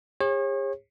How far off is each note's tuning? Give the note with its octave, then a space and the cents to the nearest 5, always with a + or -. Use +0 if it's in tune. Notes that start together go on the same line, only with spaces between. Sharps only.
G#4 -45 C#5 -35